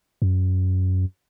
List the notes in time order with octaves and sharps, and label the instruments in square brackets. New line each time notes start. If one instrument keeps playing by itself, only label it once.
[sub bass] F#2